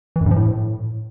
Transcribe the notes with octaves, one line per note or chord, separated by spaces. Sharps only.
E3
F#2
G2
F3
A2